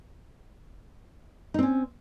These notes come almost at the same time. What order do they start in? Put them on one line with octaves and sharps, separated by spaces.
D#4 C4 C#4